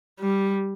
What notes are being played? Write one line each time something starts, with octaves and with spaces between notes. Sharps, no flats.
G3